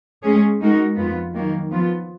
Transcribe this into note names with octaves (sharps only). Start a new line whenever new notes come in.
G#3 C#4 G#4 C#5
G#3 D#4 F#4 A#4
F2 F3 B3 F4
D#3 F#3 A#3
F3 B3 F4